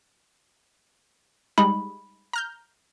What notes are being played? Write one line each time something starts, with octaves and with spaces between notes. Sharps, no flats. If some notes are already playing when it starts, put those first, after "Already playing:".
G3 G#3 D#4 B5
A#5 F6 G6